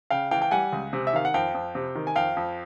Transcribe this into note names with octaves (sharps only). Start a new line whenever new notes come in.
C#3 F5 G5
E3 F5 G5
G5
G3 F#5 G#5
C#2
C3
E5
D#3 F5
F#5
F2 F5 G5
F2
C3
D#3
G#5
F2 F5 G5
F2